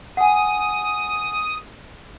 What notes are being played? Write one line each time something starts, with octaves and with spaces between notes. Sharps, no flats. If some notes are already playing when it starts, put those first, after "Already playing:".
F#5 G#5 D#6